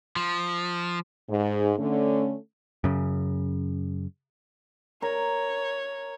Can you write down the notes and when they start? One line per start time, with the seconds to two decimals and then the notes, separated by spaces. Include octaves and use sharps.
0.16 F3
1.29 G#2
1.78 D3 A3 C#4
2.84 F#2 C#3
5.02 A#4 C#5